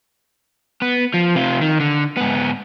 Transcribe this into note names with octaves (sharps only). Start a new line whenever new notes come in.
B3
F3
C3 F4
D#3
D3
G#2 B3